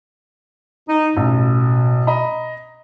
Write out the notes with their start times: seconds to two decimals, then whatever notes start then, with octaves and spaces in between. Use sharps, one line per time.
0.89 D#4
1.17 A1 B2
2.07 D#5 A#5 B5